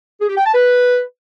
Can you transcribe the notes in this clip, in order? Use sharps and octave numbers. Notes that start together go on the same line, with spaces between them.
G#4
G4
G5
A5
B4